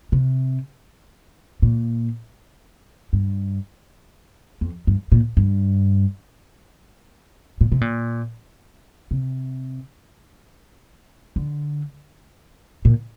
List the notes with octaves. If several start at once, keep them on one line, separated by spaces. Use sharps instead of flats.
C3
A#2
G2
F2
G2
A#2
G2
A#2
C3
A#2
C3
D3
A#2